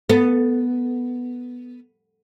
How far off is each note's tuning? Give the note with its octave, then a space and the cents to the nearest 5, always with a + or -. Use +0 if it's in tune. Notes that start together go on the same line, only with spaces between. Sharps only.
B3 +0 A4 +10